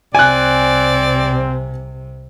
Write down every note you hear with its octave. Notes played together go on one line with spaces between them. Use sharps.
C2 C3 C4 D5 G#5 F#6